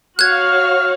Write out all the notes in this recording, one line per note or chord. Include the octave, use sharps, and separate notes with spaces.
F#4 C#5 F5 F6 F#6 G#6